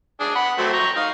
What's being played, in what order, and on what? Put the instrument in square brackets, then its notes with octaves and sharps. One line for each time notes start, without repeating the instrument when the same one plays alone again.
[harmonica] D4 G#4
F#5 B5
F#3 A3 C4
G5 A#5 C#6
D#4 F5